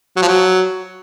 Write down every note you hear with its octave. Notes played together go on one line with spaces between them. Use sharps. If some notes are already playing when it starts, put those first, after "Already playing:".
F#3
F3
F#3